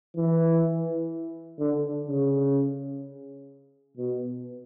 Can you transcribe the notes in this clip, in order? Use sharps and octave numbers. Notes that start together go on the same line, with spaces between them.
E3
D3
C#3
B2